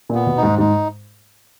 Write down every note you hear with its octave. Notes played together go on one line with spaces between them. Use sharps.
A#2
B3
B2
D#4
G#2
G#2 D#4